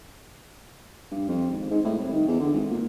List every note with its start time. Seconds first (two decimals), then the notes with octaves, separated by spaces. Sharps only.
1.12 G2
1.28 F2
1.50 G#1
1.70 G#2
1.85 A2
1.98 C2
2.12 D#3
2.27 E2
2.40 D3
2.54 G#1
2.71 A#2